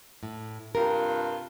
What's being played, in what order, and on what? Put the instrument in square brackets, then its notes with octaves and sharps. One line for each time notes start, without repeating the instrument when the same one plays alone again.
[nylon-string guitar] A2
[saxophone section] G2 C3 F4 [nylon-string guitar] A#4